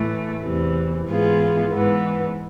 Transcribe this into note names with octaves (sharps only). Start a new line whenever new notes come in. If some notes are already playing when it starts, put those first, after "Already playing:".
Already playing: A2 E3 A3
E2 C3 E3
G#2 E3 B3 F4 G#4
G#2 E3 B3